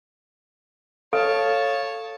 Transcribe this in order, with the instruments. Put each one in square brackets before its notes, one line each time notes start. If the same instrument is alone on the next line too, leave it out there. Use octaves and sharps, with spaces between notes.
[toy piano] A4 [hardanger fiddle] C#5 A5 [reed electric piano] F5